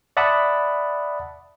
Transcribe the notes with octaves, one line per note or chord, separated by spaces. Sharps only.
D5 E5 F#5 A5 B5 D#6